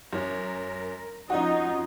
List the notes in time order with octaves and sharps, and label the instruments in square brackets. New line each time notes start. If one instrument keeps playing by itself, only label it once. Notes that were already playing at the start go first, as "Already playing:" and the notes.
[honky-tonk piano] F#2 C#4 [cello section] A#4
[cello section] F2 C#4 F4 [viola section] D#4 [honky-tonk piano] F#4 D#5